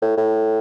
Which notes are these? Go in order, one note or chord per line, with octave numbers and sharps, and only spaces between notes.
A2
A2